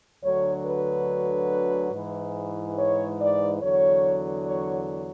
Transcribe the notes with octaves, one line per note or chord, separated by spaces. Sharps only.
D2 D3 F#3 C#5
B4
G#2 E3
C#5
D5
E2 D3 F#3 C#5
C#5